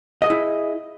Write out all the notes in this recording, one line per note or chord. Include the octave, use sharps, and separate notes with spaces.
E4 G#4 D#5